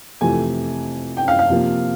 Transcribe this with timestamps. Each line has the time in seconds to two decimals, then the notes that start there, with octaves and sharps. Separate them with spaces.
0.21 F2 C3 E3 A3 G#5
1.17 G5
1.28 F5
1.39 F5
1.50 C3 F3 A#3